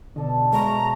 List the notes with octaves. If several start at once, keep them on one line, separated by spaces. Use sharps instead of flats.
B2 D3 D4 A4 D#5
F#3 G#3 A3 A#5 C#6